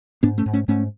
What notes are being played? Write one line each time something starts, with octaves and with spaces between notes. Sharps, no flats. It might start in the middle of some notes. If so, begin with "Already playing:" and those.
G#2 B3 D4
A3 C#4
G#2
A3 C#4
G#2 A3 C#4